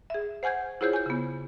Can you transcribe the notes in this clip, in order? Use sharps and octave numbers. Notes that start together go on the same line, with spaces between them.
G#4 E5
C5 F#5 G#5 G6 G#6
E4 F4 G#4 C5 C#5 G6
G#5 G6
C#3 B3